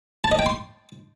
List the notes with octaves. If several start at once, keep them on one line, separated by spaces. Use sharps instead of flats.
A5
D#5
G5
C6